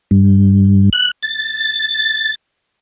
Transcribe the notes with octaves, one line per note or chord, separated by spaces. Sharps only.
G2
F#6
A6